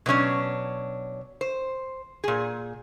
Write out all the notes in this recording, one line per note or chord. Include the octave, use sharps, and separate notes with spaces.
B2 F#3 C#4 D4
C5
A#2 G#4